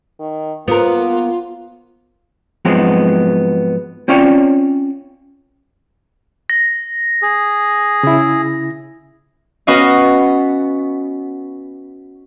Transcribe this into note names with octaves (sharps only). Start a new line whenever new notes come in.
D#3
A#3 B3 F4 A#4
G#2 F3 F#3 G#3 B3 C4
C4 C#4 F4 C#5 D5 G5
A#6
G#4
C#3 E4
B3 C#4 F#4 D#5 F5